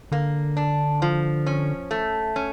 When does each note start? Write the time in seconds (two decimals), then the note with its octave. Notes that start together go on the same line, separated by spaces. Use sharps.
0.12 D3 A#3
0.57 D4
1.02 F3
1.46 C#4
1.91 A3
2.36 C#4